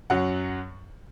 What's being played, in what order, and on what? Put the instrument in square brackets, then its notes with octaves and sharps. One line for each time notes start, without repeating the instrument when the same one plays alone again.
[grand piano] F#2 F#3 F#5